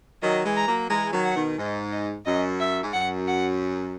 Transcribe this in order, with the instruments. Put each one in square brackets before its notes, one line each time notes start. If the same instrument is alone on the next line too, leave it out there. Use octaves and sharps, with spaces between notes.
[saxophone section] D#3 F#3 [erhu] D#5
[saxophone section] E3 G#3
[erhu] A#5
[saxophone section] F#3 A#3
[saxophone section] E3 G#3 [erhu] A#5
[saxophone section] D#3 F#3
[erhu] F#5
[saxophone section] B2 D#3
[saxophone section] G#2 [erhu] D#5
[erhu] D#5
[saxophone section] F#2 [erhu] D#5
[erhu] E5
[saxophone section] G#2
[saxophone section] F#2 [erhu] F#5
[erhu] F#5